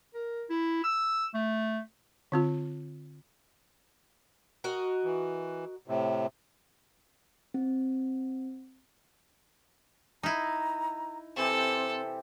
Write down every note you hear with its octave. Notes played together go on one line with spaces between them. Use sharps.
A#4
E4
E6
A3
D3 C4 F4
F#4 A#4 D#5
E3
A2 C3
C4
D#4 E4 A#5
C3 E3 C4 G4 A4